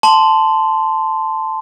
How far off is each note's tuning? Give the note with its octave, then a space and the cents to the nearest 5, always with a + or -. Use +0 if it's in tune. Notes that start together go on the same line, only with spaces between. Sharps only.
A5 +0 C6 -10